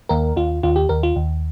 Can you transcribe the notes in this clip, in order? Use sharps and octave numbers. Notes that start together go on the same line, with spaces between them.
D#2 A#4
D#2 F4
D#2 F4
G4
D#2 A#4
F4
D#2